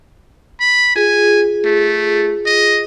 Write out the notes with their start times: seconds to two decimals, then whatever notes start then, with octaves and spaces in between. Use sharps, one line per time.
0.60 B5
0.96 F4 G#4 G#5
1.65 A3
2.46 D#5